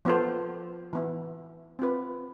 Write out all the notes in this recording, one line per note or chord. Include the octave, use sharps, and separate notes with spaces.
F3 B3 F4 A4 C5
E3 B3 E4
C4 F4 B4